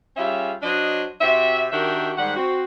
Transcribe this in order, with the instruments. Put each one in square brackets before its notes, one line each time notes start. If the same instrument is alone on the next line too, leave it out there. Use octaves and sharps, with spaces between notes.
[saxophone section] G3 C#4 F4 G#4 E5
F#3 D4 C5 D#5
C3 C4 F#4 E5
D#3 D4 F#4 G4 A#4 E5
G#2 D#3 G3 F#5
C4 F#4